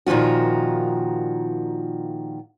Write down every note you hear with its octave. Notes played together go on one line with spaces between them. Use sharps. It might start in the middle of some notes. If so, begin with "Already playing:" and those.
A#2 D#3 F3 F4 F#4